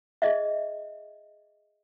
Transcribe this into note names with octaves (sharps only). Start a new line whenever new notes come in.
G#4 D#5 E5